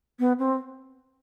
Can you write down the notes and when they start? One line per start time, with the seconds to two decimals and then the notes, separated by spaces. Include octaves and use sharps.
0.19 B3
0.39 C4